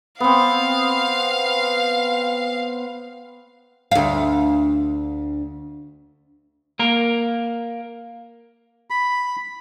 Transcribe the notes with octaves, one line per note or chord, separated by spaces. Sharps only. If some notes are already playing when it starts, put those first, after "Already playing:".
B3 C4 F5
D2 F5
A#3 A#4
B5